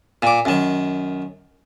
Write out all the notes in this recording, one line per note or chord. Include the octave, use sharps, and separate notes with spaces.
A#2 D6
F#2 D#3